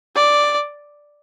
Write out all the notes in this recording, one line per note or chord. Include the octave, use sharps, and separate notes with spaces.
D5